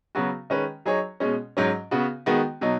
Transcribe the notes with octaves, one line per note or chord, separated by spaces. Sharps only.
C#3 F#3 B3 F#4
D#3 G#3 C#4 B4
F#3 D#4 G#4 C#5
B2 G#3 C#4
G#2 F#3 C#4
C#3 B3 F#4
D#3 G#3 B3 F#4
B2 F#3 D#4